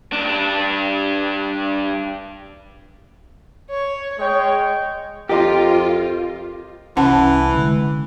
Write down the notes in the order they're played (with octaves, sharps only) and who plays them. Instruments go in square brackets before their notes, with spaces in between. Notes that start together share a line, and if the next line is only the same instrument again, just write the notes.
[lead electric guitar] G2 D4
[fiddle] C#5
[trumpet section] G#3 G5 [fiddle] C#5
[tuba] F2 [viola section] F4 [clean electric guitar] G4 [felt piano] A#4 D#5 C6
[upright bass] C2 [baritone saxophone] E3 [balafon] C#4 F#5 A5
[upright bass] D3 G#3